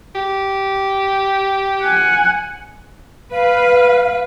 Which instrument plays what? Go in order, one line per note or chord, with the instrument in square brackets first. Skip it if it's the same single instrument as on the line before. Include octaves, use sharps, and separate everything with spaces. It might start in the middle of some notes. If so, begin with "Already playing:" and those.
[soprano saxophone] G4
[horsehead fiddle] F#5 G#5
[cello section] B4 [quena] F5